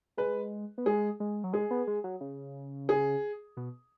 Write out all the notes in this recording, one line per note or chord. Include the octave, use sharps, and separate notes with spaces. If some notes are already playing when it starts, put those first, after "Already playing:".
G#3 B4
B3
G#3 G#4
G#3
F#3
G#3 G#4
B3
G#3
F#3
C#3
G#4
B2